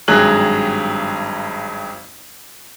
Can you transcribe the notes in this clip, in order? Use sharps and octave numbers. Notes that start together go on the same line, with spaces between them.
G#1 G2 F#3 G#4 F#6 F#7